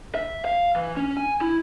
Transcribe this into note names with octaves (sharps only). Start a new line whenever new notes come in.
E5
F5
E3
C#4
G#5
E4